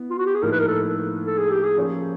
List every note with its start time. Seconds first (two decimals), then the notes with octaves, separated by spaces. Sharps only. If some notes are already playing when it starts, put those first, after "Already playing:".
Already playing: B3 E4
0.10 F4
0.18 F#4
0.26 G4
0.35 G#4
0.43 A2 F3 A#3 D#4 A#4
0.52 B4
0.59 A#4
0.68 A4
1.26 A4
1.38 G#4
1.51 G4
1.64 G#4
1.77 F3 A#3 C#4 F4